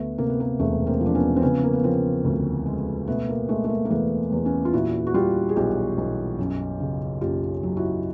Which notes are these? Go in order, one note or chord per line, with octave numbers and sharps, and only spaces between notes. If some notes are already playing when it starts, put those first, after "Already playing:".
Already playing: D2 A3 B3
C3 A#3
B3
A#3
E1 A3 B3
A#3 C4
F3
D4
B3 C#4
C4
C#3 B3 C#4
A#3
B3
F3 A#3 C4
D2
G#3
B2 A3 B3
A#3
G#3 A3
A3
A#3
A#3
E2 A3 B3
E2
B3 C#4
F4
A#2 E4 F#4
F#4
G3 F4 G4
G#4
B1 F4 G4
B1
F#2
C#3
F#1 F4 G4
F#3
E4 F#4